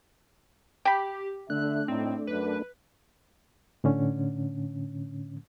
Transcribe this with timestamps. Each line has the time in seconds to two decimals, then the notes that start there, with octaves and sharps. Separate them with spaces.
0.85 G4 G5 B5
1.50 D3 A3 D4 E5 F#6
1.88 A2 C4 D#4
2.27 F#2 B4
3.84 A2 D3 C#4